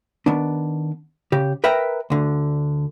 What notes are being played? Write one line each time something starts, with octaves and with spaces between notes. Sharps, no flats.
D#3 B3 D4
C#3 G4
A#4 B4 E5 G5 A#5
D2 D3